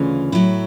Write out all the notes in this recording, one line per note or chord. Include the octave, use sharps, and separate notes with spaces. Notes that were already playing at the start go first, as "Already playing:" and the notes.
Already playing: D2 C#3 E3 F4
A2 F#3 E4